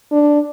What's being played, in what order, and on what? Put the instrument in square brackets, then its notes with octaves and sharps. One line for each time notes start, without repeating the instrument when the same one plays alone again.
[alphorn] D4